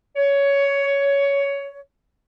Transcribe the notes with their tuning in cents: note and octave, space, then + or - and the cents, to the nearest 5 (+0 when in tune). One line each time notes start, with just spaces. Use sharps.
C#5 +15